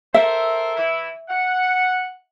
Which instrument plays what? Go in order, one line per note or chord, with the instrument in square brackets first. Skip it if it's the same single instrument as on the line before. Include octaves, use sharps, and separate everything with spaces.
[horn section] A4 A#4 C5 [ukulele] E5
[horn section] E3 E4
F#5